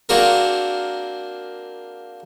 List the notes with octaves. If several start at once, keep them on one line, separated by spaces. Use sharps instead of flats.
A#3 C4 D4 F#4 G#4 A#4